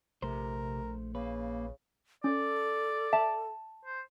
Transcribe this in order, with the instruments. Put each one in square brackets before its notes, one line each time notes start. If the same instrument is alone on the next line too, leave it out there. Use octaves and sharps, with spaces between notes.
[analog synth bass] A#1 [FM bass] C3 [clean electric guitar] A3 C5 [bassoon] A#4
[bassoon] C#3 [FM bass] A#3 [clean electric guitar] B4
[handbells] C#4 [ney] A4 [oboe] D5
[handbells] E5 [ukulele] A5
[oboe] C5